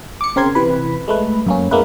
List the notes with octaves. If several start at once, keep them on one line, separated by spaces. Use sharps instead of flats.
D6 C#7
C#3 C4 A#4 C6 G#6
C3 E3 B4 B5
G#3 A3 B4
F#2 A#3 C#4
G#3 A#3 B3 E4 B4